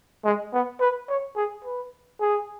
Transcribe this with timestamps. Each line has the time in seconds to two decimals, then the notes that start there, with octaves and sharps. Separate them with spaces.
0.24 G#3
0.53 B3
0.80 B4
1.09 C#5
1.36 G#4
1.65 B4
2.21 G#4